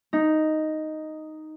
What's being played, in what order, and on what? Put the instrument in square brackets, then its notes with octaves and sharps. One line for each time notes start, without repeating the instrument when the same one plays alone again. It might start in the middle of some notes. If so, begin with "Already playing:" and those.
[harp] D#4